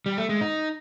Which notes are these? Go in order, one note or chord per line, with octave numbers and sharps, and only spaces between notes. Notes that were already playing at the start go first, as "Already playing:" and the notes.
G3
A3
G#3
D#4